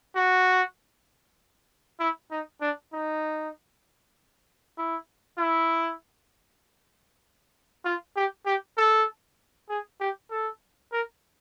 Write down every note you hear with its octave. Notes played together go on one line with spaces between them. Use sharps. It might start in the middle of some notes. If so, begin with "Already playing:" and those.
F#4
E4
D#4
D4
D#4
E4
E4
F4
G4
G4
A4
G#4
G4
A4
A#4